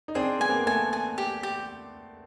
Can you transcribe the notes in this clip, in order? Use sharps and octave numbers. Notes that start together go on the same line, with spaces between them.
D#4
C4 D4 G#4
B3 G#5
A#3 C4
A3 B3 G#5
G#5
G4
G4